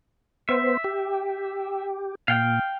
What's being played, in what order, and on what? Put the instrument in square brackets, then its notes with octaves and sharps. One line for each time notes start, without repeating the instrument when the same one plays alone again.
[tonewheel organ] B3 C5 [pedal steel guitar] E5
[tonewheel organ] G4
[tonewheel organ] A#2 [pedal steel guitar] F5 G5